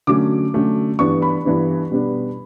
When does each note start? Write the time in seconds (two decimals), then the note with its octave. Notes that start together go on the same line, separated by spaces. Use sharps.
0.07 D3 F#3 A3 C#4 D6
0.54 D3 F#3 A3 C#4
0.99 G2 E3 B3 D4 C#6
1.22 B5
1.45 G2 E3 B3 D4
1.91 B2 G3 B3 D4